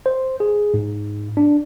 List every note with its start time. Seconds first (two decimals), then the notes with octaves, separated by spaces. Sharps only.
0.06 C5
0.40 G#4
0.74 G#2
1.37 D4